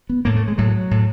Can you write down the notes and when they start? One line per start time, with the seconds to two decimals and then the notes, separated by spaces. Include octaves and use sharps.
0.09 B3
0.25 A2 A#3
0.36 A3
0.48 G#3
0.58 A2 F#3
0.91 A2